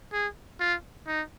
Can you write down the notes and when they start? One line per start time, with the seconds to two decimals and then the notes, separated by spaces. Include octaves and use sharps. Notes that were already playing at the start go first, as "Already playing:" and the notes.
0.13 G#4
0.60 F4
1.07 D#4